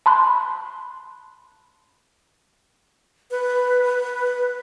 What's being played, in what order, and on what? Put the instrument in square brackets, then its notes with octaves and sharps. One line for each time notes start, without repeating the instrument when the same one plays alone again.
[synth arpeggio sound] A5 B5 C6 F#6
[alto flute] B4